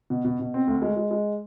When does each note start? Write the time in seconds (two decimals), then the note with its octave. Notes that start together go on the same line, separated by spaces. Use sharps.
0.10 B2
0.25 B2
0.40 B2
0.54 C4
0.68 D2
0.82 G#3
0.97 G#3
1.11 G#3